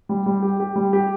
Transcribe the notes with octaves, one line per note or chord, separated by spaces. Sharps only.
G3
G3
G4
G4
G3
G4